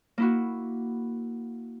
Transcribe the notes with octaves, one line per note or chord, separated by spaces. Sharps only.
A#3 E4 F#4